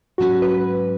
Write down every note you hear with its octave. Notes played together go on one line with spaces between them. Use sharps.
G#2 F#3 C#4 F#4
B4